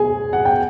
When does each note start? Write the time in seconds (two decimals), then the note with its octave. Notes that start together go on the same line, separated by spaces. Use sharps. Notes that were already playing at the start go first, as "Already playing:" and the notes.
Already playing: G#4 G#5
0.33 F#5
0.45 G5